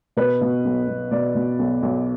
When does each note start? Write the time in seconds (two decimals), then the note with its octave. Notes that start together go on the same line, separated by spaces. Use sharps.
0.17 B2 B4
0.41 B2
0.65 B1
0.88 B1
1.11 B2 D5
1.35 B2
1.59 B1
1.83 B1